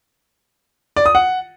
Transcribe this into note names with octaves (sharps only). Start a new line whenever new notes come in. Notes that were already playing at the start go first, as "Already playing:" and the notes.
D5
D#6
F#5